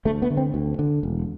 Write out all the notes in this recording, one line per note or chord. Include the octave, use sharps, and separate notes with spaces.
D2 A3
B3
D3
C4
D2
D3
E1